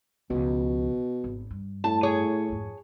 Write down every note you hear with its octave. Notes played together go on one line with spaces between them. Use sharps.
C#2 B2 F3
G#1
G2
A2 A5
G#4 C#5
F2 G#2